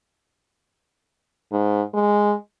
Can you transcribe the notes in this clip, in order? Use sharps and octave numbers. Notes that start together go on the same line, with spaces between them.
G#2
G#3